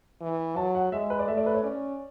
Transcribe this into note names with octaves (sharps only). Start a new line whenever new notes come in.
E3
F#3 A5
F#5
G#3 E5
B4
D5
A3 E5
D5
B4
C#5
C#4 D5